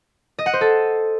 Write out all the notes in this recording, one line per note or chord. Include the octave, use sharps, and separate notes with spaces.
D#5
F#5
C5
A4